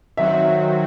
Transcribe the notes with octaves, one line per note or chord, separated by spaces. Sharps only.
D#3 F#3 C4 F#4 E5